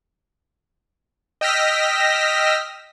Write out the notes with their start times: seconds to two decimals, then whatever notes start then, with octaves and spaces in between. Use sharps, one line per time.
1.41 D#5 G5 E6 F6 A#6 B6